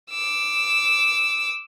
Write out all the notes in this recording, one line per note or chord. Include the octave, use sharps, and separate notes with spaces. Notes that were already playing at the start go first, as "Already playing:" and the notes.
D6 E6